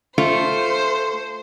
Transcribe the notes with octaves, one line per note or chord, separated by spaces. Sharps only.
A3 F4 C5